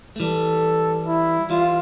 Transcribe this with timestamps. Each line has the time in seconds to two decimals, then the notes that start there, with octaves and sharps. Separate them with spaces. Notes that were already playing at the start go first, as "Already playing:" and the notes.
0.16 A3
0.20 E3 G3 A4
1.07 E4
1.50 E3 G3 F4